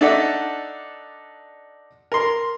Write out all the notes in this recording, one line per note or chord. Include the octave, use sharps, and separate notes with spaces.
D4 D#4 A4 D5 E5 F#5
A#4 C6